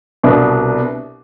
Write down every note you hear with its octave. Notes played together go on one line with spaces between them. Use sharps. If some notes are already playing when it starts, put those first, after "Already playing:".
C2 B2 B3 D4